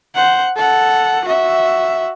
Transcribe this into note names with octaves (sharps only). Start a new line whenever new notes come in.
C5 F#5
A4 F#5
F#4 E5